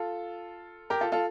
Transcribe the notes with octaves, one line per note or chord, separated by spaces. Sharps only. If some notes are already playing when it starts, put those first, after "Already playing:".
Already playing: F4 A4
G4 A#4
F4 A4
F4 A4